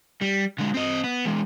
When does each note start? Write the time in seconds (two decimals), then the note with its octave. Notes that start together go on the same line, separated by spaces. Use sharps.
0.21 G3
0.58 D3 G#3
0.74 C4 D#5
1.04 B3
1.25 E3 G#3